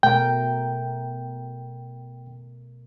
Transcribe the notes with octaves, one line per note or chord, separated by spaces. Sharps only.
B2 A3 A#4 G5